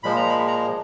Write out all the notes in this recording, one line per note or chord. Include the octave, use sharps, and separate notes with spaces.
A#2 F3 G#3 B5
A#5
B5
A#5